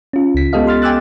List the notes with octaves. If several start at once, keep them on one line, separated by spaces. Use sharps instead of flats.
C#4 F4
C#2 B6
G#3 B3 G4 A4 D#5 F5
C6 F6 A6
G5 G#5 D6 E6 F#6 A6